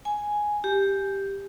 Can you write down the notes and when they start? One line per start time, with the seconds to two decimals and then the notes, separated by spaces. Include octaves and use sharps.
0.05 G#5
0.64 G4